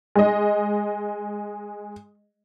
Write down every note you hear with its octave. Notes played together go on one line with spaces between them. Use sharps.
G#3 D#5